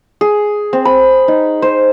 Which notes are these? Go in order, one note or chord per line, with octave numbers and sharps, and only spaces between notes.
G#4
C4
B5
D#4
C5